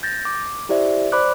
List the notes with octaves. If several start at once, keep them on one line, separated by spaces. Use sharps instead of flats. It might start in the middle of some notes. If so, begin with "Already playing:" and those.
G6 A6 A#6
D6
E4 G4 C5 D5 E5
C5 D5 B5 D6 F#6